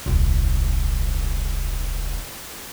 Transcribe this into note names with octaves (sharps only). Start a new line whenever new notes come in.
D#1 C2